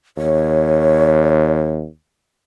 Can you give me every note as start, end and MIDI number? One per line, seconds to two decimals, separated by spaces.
0.17 1.85 39
0.17 1.68 73